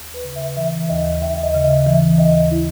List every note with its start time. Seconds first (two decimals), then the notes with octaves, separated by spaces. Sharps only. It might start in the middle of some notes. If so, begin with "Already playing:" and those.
Already playing: D#2
0.14 B4
0.24 C#3
0.36 E5
0.57 E3 E5
0.89 D#2 D#5
1.21 D#2 E5
1.37 E5
1.43 D#5
1.54 C#3
1.64 D#5
1.86 E3 E5
2.18 D#2 D#5
2.51 E4